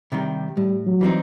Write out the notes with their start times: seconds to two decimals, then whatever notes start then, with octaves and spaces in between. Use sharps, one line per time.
0.12 C3 D#3 G3
0.57 A2 G3
0.86 F#3
1.01 E3 G3 C4 D#4